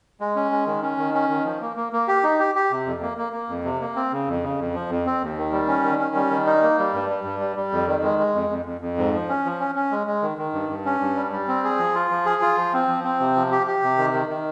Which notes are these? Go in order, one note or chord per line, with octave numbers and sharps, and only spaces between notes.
G#3
C#4
G#3
D#3
C#4
D#3
C#4
D#3
F3
A#3
A#3
A#3
G4
D#4
G4
G4
C3
F2
A#3
A#3
A#3
F2
C3
A#3
C4
C#3
F2
C#3
F2
F3
F2
C4
D#2
D#3
G3
C#4
D#3
C#4
G3
D#3
D#4
A#3
G3
G2
G3
G2
G3
G3
F2
D#3
G#3
G#3
F2
F2
F2
F2
G#2
F3
C#4
F3
C#4
C#4
G#3
G#3
D#3
D#3
G2
G2
C#4
G2
G3
G3
C4
G#4
F3
F4
F3
G#4
F4
F3
C4
F3
C4
C3
F3
G4
G4
C3
D#3
D#3
D#3